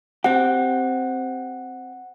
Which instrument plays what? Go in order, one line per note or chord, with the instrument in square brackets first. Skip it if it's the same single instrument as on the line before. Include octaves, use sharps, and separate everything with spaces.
[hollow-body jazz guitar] C4 G4 [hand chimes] F#5